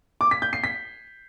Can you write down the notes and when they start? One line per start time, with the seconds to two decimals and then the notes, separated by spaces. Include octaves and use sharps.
0.21 D6
0.31 B6
0.42 G6
0.53 C7
0.64 B6